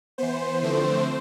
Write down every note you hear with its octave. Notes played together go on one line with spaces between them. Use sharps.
E3 B3 C5
D3 F3 A3 C4